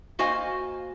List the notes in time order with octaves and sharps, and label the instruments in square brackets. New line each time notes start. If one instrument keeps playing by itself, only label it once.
[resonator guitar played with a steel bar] A#3 F#4 C5 D#5 F5 G#5